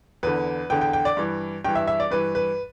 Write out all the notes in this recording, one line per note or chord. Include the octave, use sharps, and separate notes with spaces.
E2 D3 B4
E2 D3 G5
G5
G5
D5
G2 E3
G2 E3 G5
E5
E5
D5
G2 E3 B4
B4